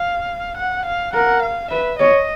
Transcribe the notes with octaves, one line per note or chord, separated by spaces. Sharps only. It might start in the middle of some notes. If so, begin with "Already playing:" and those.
Already playing: F5
F#5
F5
A#4 F#5
F5
B4 E5
C#5 D#5